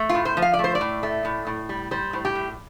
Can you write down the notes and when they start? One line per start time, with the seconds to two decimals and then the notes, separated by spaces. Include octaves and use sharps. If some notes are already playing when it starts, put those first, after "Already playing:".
Already playing: A3
0.09 F4
0.15 A2
0.25 C5
0.37 F3
0.42 F5
0.53 D5
0.59 A3
0.64 C5
0.75 D5
0.81 A2
1.03 A3
1.25 A2
1.47 A2
1.69 G3
1.91 G3 C5
2.13 A2
2.25 G4
2.35 A2